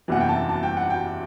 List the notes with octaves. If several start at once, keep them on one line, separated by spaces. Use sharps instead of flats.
F#1 E2 C3 E3 F#5
G5
A5
A5
G5
F#5
G5